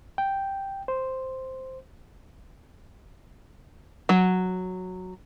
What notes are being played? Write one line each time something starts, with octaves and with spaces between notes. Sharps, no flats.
G5
C5
F#3